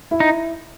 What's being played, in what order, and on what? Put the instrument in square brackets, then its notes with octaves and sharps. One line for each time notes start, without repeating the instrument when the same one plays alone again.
[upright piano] E4
[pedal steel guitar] D#4